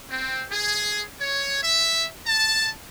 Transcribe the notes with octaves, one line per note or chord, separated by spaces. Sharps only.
C4
G#4
C#5
E5
A5